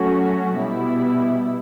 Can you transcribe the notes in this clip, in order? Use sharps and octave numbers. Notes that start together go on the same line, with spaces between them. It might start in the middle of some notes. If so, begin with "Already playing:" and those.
Already playing: F#3 A3 C#4 F#4
B2 G3 B3 E4